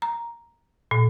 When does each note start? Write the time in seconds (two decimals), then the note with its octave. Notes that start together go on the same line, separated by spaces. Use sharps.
0.02 A#5
0.91 A#2